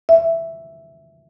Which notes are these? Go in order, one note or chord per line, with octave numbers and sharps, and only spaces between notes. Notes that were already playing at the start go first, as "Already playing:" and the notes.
E5